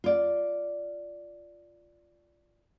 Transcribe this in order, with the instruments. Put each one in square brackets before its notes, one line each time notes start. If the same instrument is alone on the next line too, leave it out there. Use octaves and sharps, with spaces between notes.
[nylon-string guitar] F4 D5